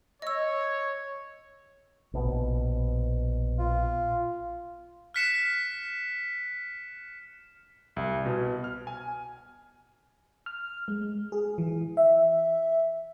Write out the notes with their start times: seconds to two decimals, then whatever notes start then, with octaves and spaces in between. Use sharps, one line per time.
0.22 C#5 D#5 E6
2.13 A#1 B2
3.59 F4
5.14 F6 F#6 B6 C#7 E7
7.96 C2
8.26 B2
8.64 F6
8.87 G#5
10.46 F6
10.88 G#3
11.32 G#4
11.58 E3
11.97 E5